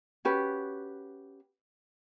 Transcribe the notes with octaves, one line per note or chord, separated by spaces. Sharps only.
C#4 F#4 G4 B4